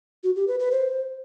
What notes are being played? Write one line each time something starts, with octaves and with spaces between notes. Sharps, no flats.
F#4
G4
B4
B4
C5